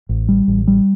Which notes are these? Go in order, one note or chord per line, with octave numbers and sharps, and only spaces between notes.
A1
G3
A1
G3